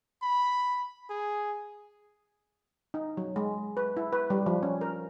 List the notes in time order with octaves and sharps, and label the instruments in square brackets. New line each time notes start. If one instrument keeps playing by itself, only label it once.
[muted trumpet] B5
G#4
[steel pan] D#4
F#3
G#3
B4
E4
B4
G3
F3
C#4
A#4